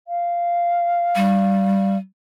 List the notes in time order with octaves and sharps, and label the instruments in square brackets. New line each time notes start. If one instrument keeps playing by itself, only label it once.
[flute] F5
[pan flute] G3